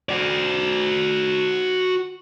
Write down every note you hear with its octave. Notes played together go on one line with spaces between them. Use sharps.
F#4 D5